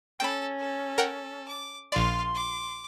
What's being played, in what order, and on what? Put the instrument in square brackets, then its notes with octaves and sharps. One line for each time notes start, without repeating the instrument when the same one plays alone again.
[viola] C#4 [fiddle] A4 [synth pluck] G5 B5
[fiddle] A4
[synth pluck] A#4 F#5 G5
[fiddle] D6
[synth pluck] A#1 D5 [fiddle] F4 F5 [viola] C6
[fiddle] D6